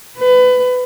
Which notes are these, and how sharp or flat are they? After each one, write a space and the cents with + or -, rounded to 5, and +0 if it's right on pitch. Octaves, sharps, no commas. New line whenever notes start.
B4 +25